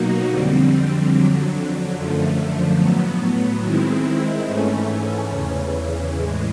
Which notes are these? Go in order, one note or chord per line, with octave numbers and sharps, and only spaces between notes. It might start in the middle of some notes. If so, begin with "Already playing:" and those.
Already playing: B2 F#3 A#3 D#4 F#4
F2 D3 G3 C4
F2 D3 F#3
F#2 D3 F3 A3
A2 F#3 B3
D#3 G#3 C4 E4
G#2 E3 A3 C#4
E2 C#3 E3
A2 E3 G#3